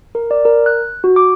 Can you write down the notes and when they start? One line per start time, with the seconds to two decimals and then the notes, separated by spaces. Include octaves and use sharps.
0.15 A#4
0.31 D5
0.45 A#4
0.66 F#6
1.04 F#4
1.16 D6